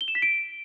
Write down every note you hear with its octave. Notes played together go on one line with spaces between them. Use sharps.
G7
E7
B6
D7